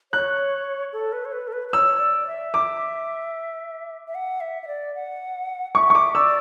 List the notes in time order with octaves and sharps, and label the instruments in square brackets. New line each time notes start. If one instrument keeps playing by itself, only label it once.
[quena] C#5 [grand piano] F#6
[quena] A4
B4
C#5
B4
A4
B4
B4
[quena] C#5 [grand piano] E6
[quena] C#5
D5
E5
[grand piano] D6
[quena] E5
F#5
E5
E5
D5
F#5
[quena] E5 [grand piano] C#6
[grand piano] C#6
D6
[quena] D5 [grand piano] E6